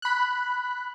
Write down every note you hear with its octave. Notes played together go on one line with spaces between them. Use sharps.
B5 F#6